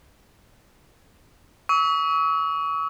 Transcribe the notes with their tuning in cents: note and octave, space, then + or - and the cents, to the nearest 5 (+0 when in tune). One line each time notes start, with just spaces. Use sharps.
C#6 +35 E6 -40